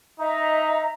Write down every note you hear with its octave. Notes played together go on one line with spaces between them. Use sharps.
D#4 D#5 E5 A#5